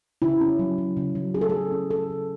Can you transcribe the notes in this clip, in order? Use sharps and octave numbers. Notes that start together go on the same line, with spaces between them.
C#3 E4
C#4
F#3
F#3
C#3
F#3
C#4 G#4
A4
F#3 G#4
C#4
C#3 A4
C#3